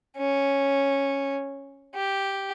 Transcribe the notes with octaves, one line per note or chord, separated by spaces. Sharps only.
C#4
G4